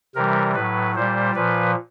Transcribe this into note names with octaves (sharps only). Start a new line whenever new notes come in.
C3 E3 G3 A#4
A2 F#3 B4
A#2 G3 C5
A#2 F3 B4